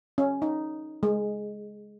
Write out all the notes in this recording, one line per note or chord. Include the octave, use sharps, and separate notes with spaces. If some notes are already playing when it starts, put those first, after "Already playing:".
C#4
D#4
G#3